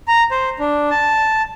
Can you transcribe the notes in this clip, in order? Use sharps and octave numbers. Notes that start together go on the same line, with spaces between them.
A#5
C5
D4
A5